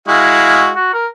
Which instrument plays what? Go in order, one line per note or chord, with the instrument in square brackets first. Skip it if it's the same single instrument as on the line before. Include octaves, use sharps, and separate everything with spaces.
[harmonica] G#3 F#4 F5 [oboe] E4
[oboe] F#4
A#4